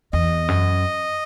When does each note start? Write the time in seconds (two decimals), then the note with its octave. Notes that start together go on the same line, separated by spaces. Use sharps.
0.13 E2 D#5
0.48 F#2